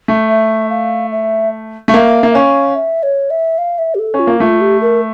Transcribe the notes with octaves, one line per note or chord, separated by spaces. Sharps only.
A3
E5
F5
E5
A3 F5
A#3 E5
A#3
E5
C#4 F5
E5
C#5
E5
F5
E5
G4
A4
C#4
F4
A#3
A3 F4
G4
A#4